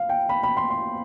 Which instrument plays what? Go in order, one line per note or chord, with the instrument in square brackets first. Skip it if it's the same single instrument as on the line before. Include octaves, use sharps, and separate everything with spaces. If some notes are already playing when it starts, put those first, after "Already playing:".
Already playing: [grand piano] F5
G5
B5
B5
C6
C6